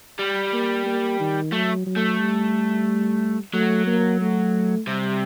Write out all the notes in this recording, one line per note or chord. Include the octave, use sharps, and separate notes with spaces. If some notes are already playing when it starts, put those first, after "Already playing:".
G3
A#3
A#3
D#3
F#3 A3
F#3
A3
G3
F#3 A3
A#3
A3
C3 G3